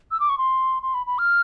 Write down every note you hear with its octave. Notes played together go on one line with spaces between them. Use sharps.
E6
D6
C#6
C6
C6
B5
B5
F6